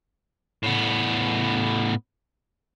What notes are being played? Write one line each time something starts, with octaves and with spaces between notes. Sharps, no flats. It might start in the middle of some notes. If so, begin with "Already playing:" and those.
A2 B3